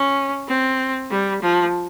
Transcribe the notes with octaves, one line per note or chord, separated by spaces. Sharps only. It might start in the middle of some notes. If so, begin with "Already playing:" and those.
Already playing: C#4
C4
G3
F3